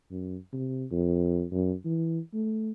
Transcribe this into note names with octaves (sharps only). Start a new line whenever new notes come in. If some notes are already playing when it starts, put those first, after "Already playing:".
F#2
C3
F2
F#2
E3
A3